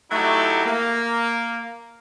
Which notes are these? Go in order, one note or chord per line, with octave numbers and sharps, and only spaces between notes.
F#3 A3 D#4 E4 F#4 G4
A#3